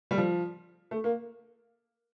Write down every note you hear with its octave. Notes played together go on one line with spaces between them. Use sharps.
G3
F3
A3
A#3